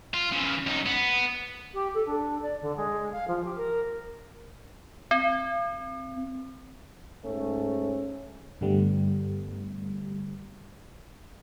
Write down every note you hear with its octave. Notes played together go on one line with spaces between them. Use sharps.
F4
C#3 E3
F#2 D#4
B3
G4
A4
D4
D5
D3
G#3
F5
F3
G4
A#4
C4
G#2 A3 C#4
G2 D3 G3 A3 B3